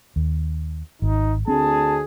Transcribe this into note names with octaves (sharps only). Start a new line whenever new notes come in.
D#2
G#1 D#4
D2 C4 D4 G#4 A5